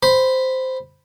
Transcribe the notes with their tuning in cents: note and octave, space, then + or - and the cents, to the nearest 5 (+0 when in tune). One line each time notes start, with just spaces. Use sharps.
C5 -10 B5 +0